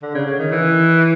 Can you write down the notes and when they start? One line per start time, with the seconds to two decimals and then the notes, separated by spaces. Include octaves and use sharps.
0.03 D3
0.15 C#3
0.26 C#3
0.39 D#3
0.52 E3